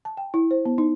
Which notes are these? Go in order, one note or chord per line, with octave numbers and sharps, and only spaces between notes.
A5
G5
E4
C5
B3
D#4